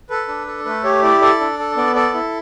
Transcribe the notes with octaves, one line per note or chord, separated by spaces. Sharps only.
A4 B4
D4
A4
A3 B4
G4 C#5
E4 D5
A4 D5
D4
A4
B3 D5
A4 D5
E4